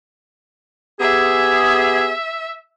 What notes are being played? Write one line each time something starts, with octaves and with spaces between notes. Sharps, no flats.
B3 G4 G#4 E5